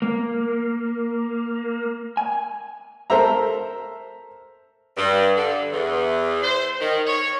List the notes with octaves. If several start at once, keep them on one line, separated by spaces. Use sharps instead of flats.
A#3
G#5
A4 A#4 C5 E5 A#5
G2
D3
E2
C5
D#3
C#5